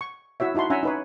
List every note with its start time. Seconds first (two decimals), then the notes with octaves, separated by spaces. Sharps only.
0.01 C#6
0.40 E4 F#4 C#5 E5
0.55 D#4 E4 F#4 A5 C6
0.70 C#4 D4 E5 F#5 G#5 A#5
0.83 D#4 B4 C#5